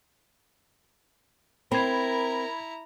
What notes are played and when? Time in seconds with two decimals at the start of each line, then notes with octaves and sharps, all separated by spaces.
1.72 C4 E4 A#4 A#5 B5 G#6